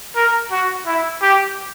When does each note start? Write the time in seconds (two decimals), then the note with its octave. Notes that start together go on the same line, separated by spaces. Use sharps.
0.16 A#4
0.51 F#4
0.86 E4
1.22 G4